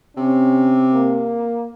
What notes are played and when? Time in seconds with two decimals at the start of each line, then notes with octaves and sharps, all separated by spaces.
0.17 C3 C#4
0.94 A#3